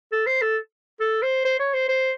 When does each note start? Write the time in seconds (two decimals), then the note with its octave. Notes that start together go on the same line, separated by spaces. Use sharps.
0.12 A4
0.27 C5
0.42 A4
1.00 A4
1.22 C5
1.45 C5
1.59 C#5
1.74 C5
1.89 C5